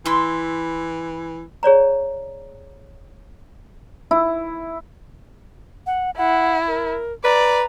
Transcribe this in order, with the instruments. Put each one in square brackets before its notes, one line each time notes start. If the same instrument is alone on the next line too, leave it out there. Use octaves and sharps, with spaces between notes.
[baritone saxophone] E3 [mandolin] E4 C6 E6
[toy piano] G#4 C#5 D5 A#5
[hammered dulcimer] E4
[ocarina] F#5
[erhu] E4 [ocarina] F#5
[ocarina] A#4
[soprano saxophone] B4 [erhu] D5 [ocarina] A#5